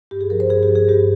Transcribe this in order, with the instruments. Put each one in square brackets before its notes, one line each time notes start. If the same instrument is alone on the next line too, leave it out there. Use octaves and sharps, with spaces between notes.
[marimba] G2 G4
G#4
F3 A#4
C5
G2 G#4
G4
F3
G#4
G2 G4